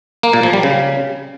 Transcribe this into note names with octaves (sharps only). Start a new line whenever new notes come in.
A#3
A#2
F3
G3
C#3